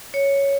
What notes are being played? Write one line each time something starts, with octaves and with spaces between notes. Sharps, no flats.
C#5